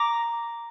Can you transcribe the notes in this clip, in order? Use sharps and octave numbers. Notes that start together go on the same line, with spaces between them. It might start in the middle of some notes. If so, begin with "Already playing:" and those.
Already playing: A#5 D6